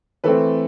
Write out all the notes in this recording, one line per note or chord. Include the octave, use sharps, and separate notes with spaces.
E3 A3 C4 A4 B4